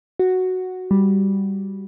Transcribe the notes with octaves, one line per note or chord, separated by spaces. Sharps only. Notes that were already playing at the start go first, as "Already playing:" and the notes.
F#4
G3